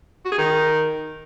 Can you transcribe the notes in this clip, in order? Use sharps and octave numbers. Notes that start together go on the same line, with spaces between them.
F#4
G#4
D#3